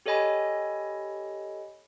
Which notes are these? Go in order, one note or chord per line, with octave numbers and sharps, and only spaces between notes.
G4 A4 C#5 D#5 G#5 B5